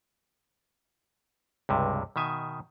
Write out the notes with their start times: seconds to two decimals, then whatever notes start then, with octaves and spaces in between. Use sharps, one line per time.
1.69 C#2 G2 C3
2.16 B2 D#3 E5 G#5